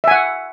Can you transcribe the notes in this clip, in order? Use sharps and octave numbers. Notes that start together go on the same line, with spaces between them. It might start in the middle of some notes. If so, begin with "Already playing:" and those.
E5 F#5 G#5